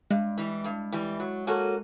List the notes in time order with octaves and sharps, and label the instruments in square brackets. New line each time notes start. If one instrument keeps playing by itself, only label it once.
[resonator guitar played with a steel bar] G2 [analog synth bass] G#3
[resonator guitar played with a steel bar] E3 G3
G2
E3 G3
F#3
A#3 C#4 F#4 A4